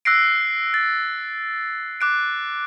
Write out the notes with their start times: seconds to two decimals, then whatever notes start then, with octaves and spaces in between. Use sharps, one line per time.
0.05 E6 F#6 A#6 C7 D7
0.74 A6
2.01 D6 F#6 D7